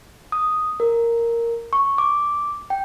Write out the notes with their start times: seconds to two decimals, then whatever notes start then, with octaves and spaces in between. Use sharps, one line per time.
0.32 D#6
0.80 A#4
1.73 C#6
1.98 D6
2.70 G5